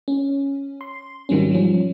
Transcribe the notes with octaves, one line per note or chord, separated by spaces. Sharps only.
C#4
C6
G#2 D#3 F#3 G3 C4 C#4
F3 G3 C#4